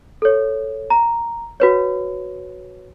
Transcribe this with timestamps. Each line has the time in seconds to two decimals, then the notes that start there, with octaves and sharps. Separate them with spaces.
0.22 A4 C#5
0.90 A#5
1.60 F#4 B4 C#5